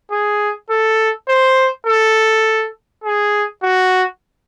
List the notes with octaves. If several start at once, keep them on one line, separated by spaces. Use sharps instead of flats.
G#4
A4
C5
A4
G#4
F#4